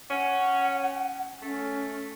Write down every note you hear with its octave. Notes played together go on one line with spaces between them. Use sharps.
C#4 F#5
A3 C#4